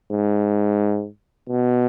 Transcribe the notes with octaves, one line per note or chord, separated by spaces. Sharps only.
G#2
B2